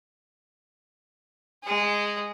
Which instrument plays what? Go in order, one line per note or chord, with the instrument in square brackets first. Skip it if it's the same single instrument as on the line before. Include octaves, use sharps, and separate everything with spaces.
[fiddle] G#3 G#4